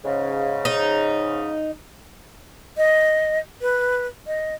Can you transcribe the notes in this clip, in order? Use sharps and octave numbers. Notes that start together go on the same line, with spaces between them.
G#2 C#3
D#4
D#5
B4
D#5